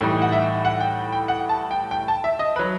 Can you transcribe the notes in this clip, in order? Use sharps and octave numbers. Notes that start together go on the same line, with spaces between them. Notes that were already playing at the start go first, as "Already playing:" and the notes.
A2 E3 G3 D#4
F#5
E5
F#5
G5
G5
F#5
A5
G5
G5
A5
E5
D#5
B4
F#3